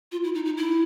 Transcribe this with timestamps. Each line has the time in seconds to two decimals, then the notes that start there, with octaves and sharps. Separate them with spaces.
0.12 F4
0.24 E4
0.35 D#4
0.45 D#4
0.57 E4